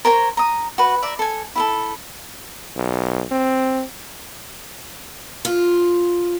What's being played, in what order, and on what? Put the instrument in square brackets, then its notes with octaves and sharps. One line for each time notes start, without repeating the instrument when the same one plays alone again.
[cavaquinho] A#4 C5 C#5 A#5
A#5 D#6
F#4 B4
D5 E5 A#5
A4 G#5
E4 G#4 A4
[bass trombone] B1
C4
[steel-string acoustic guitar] F4